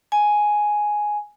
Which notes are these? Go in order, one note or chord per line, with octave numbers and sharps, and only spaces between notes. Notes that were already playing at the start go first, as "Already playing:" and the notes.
G#5